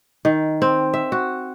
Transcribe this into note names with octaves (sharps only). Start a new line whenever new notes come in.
D#3
C4
E5
F#4